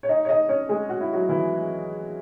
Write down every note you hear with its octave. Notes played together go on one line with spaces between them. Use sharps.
C#5
D#4 D#5
C#5
D#4 D#5
C#4 C#5
G#3 G#4
F#4
E4
F#3 F#4
E3 E4